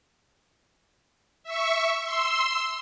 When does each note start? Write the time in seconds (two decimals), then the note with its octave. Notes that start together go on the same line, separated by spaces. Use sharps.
1.43 E5 C#6
2.02 C6 E6